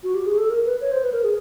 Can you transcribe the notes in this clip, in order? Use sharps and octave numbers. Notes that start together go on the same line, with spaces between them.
F#4
G4
G#4
A4
A#4
B4
C#5
C5
B4
A#4
G#4